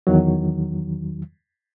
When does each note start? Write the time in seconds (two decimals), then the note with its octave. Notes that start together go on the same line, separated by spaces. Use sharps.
0.07 E2 D#3 F#3